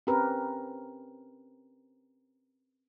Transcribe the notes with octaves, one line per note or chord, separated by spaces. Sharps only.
C4 C#4 G4 A#4 B4